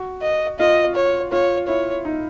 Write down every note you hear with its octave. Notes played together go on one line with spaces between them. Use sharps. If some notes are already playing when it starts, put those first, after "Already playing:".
Already playing: F#4
D#5
F4 D#5
C#5
F4 C#5
E4 C#5
D#4